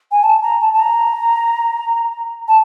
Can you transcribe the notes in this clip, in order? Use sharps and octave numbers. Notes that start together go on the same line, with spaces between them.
G#5
A5
A#5
A5
A5
A#5
A5